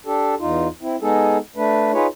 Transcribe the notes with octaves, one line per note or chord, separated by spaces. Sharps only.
D4 G4 A4
E2 D#4 F4
C4 E4
G#3 B3 D#4 G#4 A4
A3 D4 B4
D#4 F4 G#4 B4 C#5